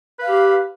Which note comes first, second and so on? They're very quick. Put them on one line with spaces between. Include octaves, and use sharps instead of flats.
B4 F5 G4